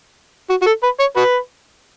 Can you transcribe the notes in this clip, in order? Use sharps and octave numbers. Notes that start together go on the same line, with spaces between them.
F#4
F#4
A4
B4
C#5
F#4 B4